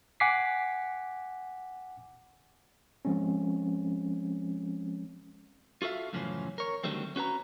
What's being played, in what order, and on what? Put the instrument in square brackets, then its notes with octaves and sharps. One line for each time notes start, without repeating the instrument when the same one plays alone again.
[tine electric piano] F#5 G#5 D6 B6 C7
F3 G#3 C4 C#4
[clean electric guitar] F4 F#4 A4 E5 F5
F#2 A2 C#3 E3 F3 C#4
A#4 C#5
D3 D#3 F#3 G3 A3 C4
C#4 F#4 B4 A#5